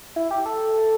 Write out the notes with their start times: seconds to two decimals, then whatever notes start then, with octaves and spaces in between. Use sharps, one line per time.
0.16 E4
0.31 G4
0.46 A4